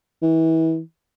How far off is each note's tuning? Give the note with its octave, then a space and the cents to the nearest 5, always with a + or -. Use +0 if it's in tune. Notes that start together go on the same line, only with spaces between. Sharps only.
E3 -30